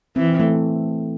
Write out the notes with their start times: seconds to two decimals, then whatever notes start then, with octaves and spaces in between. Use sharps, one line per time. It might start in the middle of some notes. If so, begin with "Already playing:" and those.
0.16 E3 C4
0.40 A3